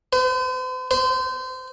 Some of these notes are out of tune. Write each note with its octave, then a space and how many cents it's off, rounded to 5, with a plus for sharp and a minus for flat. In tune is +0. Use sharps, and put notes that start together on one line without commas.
C5 -45
C5 -30